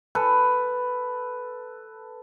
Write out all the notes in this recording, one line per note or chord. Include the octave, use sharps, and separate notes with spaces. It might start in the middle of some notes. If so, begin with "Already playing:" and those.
A4 B4